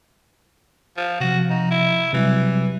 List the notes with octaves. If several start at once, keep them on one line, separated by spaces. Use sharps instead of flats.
F3
C3 F3 F#4
D#4
E4
C3 E3 F#3 G3